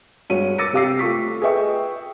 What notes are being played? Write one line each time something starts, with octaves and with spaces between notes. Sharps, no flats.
G2 G#3 F#4 C#5 D#7
D6 E6 A6 A#6 C#7 D#7
C3 G4 F5 D6 E6 C7
A3 F4 C#6 B6
G#4 B4 D#5 E5 G5 C#6